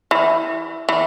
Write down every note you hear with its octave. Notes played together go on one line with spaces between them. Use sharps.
E3
E3